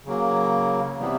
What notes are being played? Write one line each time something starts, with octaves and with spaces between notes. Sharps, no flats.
C#3 F#3 A#3
C3 E3 G3 B3